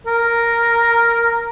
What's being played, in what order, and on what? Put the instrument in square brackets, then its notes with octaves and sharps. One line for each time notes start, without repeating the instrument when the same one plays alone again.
[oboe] A#4